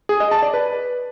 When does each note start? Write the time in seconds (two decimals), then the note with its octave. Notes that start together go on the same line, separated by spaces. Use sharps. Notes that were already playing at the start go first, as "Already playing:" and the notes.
0.09 G#4
0.20 D#5
0.31 A5
0.42 D5
0.54 B4